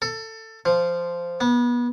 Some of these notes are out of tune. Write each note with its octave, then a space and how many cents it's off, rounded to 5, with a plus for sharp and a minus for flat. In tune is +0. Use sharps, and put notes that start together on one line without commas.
A4 +20
F3 -10
B3 -30